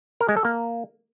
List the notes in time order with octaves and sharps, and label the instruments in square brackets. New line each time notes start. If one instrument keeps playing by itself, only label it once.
[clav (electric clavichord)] A#4
G#3
A4
A#3